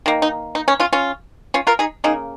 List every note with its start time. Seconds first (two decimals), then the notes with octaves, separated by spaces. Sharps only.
0.06 D#3 A#3
0.22 D#4
0.55 D#4
0.68 C#4
0.80 C#4 F4
0.93 C#4 F4
1.54 C#4 F4
1.67 F4 A#4
1.79 D#4 G#4
2.04 C#3 A#3 D#4 G#4